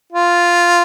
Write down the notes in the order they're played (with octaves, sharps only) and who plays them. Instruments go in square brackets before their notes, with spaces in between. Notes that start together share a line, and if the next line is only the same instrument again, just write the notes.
[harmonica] F4